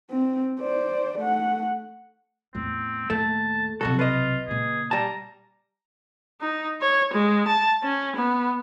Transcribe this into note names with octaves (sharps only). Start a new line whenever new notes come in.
C4
C5 D5
A3 F#5
E2 A2 C4
D#2 A2 A3 A5
B1 F2 G#2 C3 F#4 A4
F4 B4 D#5
A#2 C#3 G#4
G3 A5 A#5
D#4
C#5
G#3
A5
C#4
B3